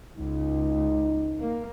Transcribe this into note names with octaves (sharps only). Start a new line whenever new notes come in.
C#2 D#4
A#3